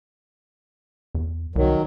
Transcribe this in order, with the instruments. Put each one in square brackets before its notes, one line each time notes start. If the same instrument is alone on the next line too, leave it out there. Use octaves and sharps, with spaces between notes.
[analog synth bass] E2
[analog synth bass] C2 [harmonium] D#3 F#3